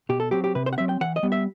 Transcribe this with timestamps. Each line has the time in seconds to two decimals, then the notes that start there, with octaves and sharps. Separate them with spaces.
0.09 B2 G4
0.20 A4
0.31 F#3 C4 G4
0.44 G4
0.55 C3 B4
0.66 C5
0.73 F#5
0.78 F#3 C4 E5
0.89 G5
1.01 E3 F#5
1.16 D#5
1.23 G3 B3
1.32 E5